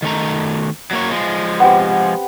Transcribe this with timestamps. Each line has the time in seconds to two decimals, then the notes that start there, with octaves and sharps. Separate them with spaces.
0.02 D#3 A3 A#5
0.91 F#3 A#3 C#5
1.10 F3 G#3
1.60 B3 C4 G4